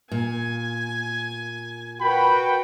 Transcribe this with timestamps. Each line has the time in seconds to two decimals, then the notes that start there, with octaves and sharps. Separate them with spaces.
0.12 A#2 G#5
2.01 F#4 A#4 B4 G5 B5